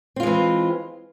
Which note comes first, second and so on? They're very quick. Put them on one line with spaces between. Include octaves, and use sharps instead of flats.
C4 F4 G#3 E3